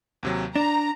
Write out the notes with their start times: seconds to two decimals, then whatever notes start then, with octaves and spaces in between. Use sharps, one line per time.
0.23 D#2 C3 F#3
0.56 D4 A#5 E7